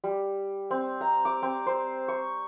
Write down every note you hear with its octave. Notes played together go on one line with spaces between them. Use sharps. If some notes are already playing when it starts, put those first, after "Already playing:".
G3
C4
A#5
D6
C4
C5
C#6